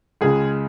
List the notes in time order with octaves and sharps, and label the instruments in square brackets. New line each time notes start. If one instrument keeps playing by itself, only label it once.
[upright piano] C#2 C#3 G#3 G#4